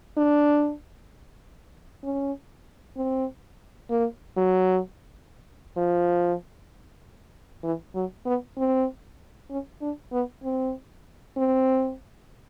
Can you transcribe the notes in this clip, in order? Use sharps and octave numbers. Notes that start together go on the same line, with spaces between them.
D4
C#4
C4
A#3
F#3
F3
E3
F#3
B3
C4
C#4
D4
B3
C4
C4